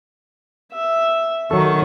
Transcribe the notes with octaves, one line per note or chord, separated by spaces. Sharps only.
E5
D#3 F#3 A4 C#6